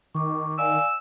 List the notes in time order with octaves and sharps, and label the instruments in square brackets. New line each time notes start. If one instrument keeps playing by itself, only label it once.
[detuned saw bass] D#3 [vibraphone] C#6 D6
[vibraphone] D5 F5 G#5 [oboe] E6